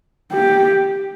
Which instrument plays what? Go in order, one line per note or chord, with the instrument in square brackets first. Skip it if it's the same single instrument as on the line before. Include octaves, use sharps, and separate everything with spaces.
[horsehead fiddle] G4